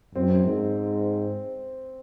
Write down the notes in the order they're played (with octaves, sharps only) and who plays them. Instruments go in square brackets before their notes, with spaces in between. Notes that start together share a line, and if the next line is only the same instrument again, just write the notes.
[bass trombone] F#2 [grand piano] C4
[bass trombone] G#2